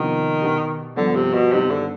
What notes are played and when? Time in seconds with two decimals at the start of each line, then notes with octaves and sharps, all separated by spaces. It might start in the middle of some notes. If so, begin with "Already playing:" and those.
Already playing: C3 D#3 F3 B3 D4 G4
0.41 B2 B3 D4 G4
0.97 G2 D3 F3 B3
1.15 C3
1.34 B2
1.52 G2 C3 D#3 B3 D#4
1.70 D3